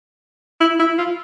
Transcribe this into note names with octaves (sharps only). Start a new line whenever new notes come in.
E4
E4
F4